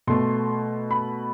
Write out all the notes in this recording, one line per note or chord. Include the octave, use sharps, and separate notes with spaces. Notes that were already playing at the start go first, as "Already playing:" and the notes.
B2 A3 C6
B5